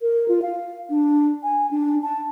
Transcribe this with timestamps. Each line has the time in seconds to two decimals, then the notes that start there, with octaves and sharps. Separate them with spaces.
0.02 A#4
0.28 F4
0.42 F5
0.90 D4
1.43 G#5
1.71 D4
2.03 A5